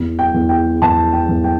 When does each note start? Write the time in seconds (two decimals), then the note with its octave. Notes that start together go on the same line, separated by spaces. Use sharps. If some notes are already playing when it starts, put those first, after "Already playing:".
Already playing: E2
0.19 G5
0.34 E2
0.49 G5
0.82 E2 A5
1.13 G5
1.29 E2
1.44 G5